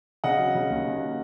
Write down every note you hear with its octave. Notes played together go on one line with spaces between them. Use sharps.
C#3 D#5 F#5
F#3
C#3
D#2
D#2